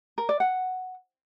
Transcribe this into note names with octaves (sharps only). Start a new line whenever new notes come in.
A#4
D5
F#5